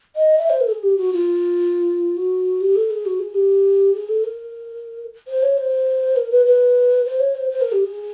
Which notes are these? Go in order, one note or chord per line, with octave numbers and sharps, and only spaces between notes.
D#5
E5
C5
A#4
A4
G#4
G4
F#4
F4
F#4
G4
A4
G#4
F#4
G#4
G4
G#4
A4
A#4
C5
C#5
C5
A#4
B4
B4
C5
C#5
C5
C5
A#4
G4
G#4